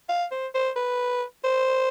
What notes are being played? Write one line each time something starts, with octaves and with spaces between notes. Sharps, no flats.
F5
C5
C5
B4
C5